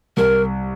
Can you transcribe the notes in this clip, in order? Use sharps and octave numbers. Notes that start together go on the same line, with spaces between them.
C2 A#4